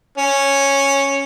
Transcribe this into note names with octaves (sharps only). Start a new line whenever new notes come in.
C#4